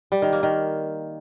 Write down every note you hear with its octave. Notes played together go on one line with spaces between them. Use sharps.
G3
D#3
A#3
D#3